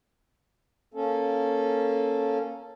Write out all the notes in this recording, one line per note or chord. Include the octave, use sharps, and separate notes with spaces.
A#3 C#4 A4